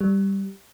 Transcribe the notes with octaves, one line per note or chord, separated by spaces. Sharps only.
G3